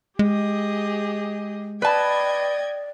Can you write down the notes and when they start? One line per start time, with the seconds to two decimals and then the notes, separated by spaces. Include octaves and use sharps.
0.19 G#3 G4 G#4 D#5
1.82 B4 D5 D#5 G5 A5 G#6